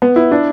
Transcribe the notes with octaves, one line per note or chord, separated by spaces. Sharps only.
B3
E4
D4